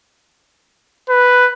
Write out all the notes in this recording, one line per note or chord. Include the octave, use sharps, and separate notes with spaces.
B4